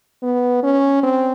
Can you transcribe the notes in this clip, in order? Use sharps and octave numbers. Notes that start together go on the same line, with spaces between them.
B3
C#4
C4